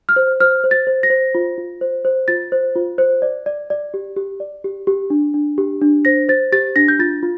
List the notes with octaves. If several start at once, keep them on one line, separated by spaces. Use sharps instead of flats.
F6
C5
C5 F6
C5
A6
C5
A#6
C5
F4
F4
C5
C5
F4 A6
C5
F4
C5
D5
D5
D5
G4
G4
D5
G4
G4
D4
D4
G4
D4
C5 A#6
C5 A6
G4 A6
D4 A#6
G6
F4 A6
F4